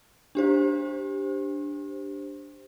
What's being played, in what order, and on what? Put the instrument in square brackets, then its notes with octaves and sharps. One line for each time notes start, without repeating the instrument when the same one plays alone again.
[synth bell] D4 G4 C5